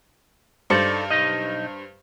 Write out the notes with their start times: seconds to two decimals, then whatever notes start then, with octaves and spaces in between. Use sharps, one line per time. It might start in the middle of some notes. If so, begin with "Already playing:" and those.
0.70 G2 D#4 A4 C5 D5 C#7
1.10 B1 D#4 D#5